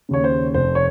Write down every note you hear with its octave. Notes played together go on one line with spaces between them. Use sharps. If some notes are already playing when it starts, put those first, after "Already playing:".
D#2 C#3 C#5
C5
F1 C5
C#5